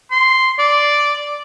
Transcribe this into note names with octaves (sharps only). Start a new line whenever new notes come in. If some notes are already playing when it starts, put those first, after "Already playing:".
C6
D5